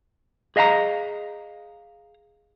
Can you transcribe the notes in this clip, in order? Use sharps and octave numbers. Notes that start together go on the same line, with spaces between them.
G#4 D#5 F5 G#5 A#5